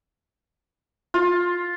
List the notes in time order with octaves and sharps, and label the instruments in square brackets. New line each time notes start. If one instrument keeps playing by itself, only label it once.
[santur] F4